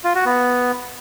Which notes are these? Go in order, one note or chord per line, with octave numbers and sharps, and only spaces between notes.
F4
F#4
B3